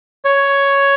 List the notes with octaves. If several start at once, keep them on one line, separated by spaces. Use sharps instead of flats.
C#5